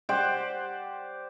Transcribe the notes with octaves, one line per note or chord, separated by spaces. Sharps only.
G4 C5 D5 F#5